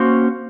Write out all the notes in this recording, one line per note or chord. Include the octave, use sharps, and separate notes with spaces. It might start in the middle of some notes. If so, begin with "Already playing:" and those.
Already playing: A#3 C#4 F#4 C5